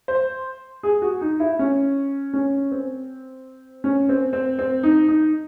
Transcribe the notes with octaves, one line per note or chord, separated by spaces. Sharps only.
C5
G#4
F#4
D#4
E4
C#4
C#4
C4
C#4
C4
C4
C4
D#4
D#4